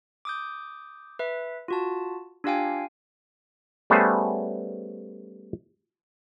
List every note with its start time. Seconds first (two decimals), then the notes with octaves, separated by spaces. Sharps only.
0.25 D6 D#6 G6
1.19 B4 E5
1.68 F4 F#4 A5
2.44 D4 F4 G4 F5 G5 G#5
3.90 G3 A3 B3 C#4 G#4 C5